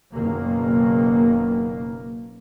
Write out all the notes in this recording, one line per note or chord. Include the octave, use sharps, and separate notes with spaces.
F#1 B2 D#3 A#3